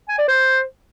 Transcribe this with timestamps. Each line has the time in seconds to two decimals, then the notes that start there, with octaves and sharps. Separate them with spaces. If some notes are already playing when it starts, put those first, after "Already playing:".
0.08 G#5
0.18 D5
0.28 C5